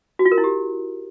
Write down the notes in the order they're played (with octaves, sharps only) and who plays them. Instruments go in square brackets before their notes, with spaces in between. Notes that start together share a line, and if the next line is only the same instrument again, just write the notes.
[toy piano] F#4
F4
A#4
E4
G4